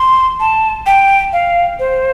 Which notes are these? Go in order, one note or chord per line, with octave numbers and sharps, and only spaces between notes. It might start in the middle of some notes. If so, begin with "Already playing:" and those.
Already playing: C6
A5
G5
F5
C5